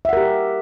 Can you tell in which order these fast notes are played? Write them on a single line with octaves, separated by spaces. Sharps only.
E5 F#5 A#4 G4